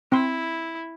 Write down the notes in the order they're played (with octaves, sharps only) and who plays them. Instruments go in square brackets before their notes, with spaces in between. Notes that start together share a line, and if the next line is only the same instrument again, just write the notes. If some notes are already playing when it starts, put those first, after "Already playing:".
[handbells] C4 G5 C6 [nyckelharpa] E4